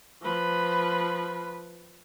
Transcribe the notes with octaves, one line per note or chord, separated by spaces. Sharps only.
F3 B4